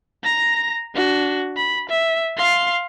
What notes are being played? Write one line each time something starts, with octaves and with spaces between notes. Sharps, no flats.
A#5 A#6
D4 F#4
B5
E5
F5 C6